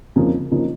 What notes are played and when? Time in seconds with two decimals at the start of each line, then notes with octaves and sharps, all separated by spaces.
0.16 F2 C#3 F3 A#3 D#4
0.51 C#3 F3 A#3 D#4